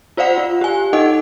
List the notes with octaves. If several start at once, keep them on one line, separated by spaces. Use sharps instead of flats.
F4 C5 D5 F5 F#5
F4
G4 G#5
D#4 A4 D#5 F#5